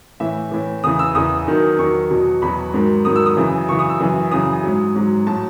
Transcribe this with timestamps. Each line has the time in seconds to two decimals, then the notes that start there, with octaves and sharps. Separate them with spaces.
0.20 A2 E3 E5
0.51 A2 E3
0.83 E2 C#3 E3 D#6
0.99 E6
1.15 E2 C#3 E3 D#6
1.47 E2 D#3 F#3
1.78 E2 D#3 F#3 C#6
2.10 E2 B2 F#3
2.42 E2 B2 F#3 B5
2.73 G#2 D#3 F#3
3.05 G#2 D#3 F#3 D#6
3.16 E6
3.26 D#6
3.37 F#2 C#3 E3
3.68 F#2 C#3 E3 C#6
3.79 D#6
3.89 E6
4.00 F#2 C#3 E3
4.31 F#2 C#3 E3 D#6
4.63 G#2 F#3
4.95 G#2 F#3
5.27 A2 F#3 A5